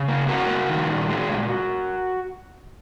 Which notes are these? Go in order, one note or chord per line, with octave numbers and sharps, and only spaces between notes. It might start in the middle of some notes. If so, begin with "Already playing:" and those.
Already playing: C#3
A#3
A#3 F#4 A#4
A#3
D#3
A#2
G#3
A#2